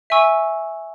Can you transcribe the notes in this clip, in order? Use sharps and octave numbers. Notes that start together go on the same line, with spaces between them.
E5 G#5 C#6 E6